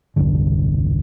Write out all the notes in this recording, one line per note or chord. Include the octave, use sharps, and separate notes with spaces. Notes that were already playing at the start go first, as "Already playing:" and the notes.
E1 C2 G2 D3